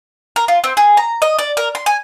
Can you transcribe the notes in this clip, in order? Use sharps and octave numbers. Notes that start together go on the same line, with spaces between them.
A#4
F4
C4
G#4
A#5
D#5
D5
A#4
C6
G#5